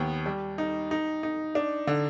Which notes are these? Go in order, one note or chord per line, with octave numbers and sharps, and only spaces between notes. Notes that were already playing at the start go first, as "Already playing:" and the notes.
Already playing: D#2 B3
G3
D#4
D#4
D#4
D4
D3